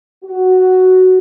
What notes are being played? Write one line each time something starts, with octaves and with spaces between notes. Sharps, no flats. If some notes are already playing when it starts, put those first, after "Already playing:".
F#4